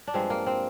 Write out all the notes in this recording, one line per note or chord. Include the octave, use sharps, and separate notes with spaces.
D4
G2 F3 G#3 C4
A#3
C4